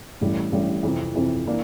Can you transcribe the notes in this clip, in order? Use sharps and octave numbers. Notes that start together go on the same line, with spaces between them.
A1 A2 G3
A1 A2 G3
F2 C3 E3
F2 C3 E3
E3 A#3 D4